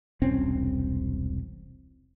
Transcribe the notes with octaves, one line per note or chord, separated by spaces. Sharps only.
E1 C2 C4 C#4